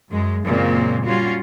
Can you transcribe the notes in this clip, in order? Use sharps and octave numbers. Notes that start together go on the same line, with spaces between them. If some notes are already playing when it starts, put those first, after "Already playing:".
F#2 G#3
F#2 A#2 C#3 G#3 A#3 C4
G3 C#4 F4 F#4